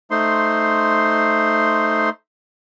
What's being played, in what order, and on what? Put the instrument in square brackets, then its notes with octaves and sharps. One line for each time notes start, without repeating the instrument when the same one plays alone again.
[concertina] A3 D#4 C5 C6